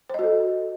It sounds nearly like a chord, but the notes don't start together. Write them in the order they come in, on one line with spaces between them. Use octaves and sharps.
C5 D#5 F#4 A4